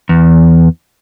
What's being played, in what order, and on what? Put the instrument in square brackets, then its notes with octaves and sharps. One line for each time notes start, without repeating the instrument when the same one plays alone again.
[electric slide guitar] E2